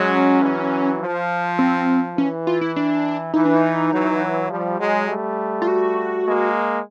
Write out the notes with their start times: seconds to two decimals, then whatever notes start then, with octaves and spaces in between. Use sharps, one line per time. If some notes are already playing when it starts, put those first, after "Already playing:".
Already playing: F#3 G#3 C#4
0.42 E3 F#3
1.01 F3
1.59 C4
2.17 E3 C#4
2.47 F4
2.61 E4
2.76 D4
3.34 E3 D#4
3.45 D4
3.55 D#4
3.92 E3 F#3
4.50 F3 G3
4.80 F#3 G#3
5.09 G3 A3
5.62 F4
5.68 F#4
6.26 G#3 A#3